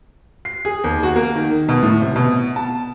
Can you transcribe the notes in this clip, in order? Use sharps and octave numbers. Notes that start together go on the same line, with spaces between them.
C7
G#4
D#2
F#4
A#3
D#3
B2
A2
C3
B2
A5